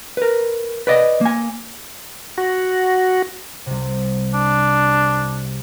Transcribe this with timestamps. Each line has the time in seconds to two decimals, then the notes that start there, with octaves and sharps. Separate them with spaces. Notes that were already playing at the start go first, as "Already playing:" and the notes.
0.17 A#4 B4
0.87 B4 D5 D#5
1.21 A#3 G#5
2.38 F#4
3.66 C2 C3
4.34 D4